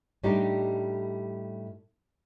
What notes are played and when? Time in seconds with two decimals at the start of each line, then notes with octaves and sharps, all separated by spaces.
0.23 A2 G3 A3 D4 D#4 G4